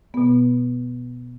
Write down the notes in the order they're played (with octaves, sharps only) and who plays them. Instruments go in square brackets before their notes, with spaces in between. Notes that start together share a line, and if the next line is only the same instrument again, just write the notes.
[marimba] B2 B3